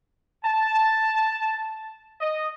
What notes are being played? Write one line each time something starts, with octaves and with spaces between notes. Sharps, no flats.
A5
D#5